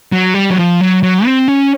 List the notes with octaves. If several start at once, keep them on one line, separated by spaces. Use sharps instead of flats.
F#3
G3
F#3
F3
F#3
F#3
C4
C#4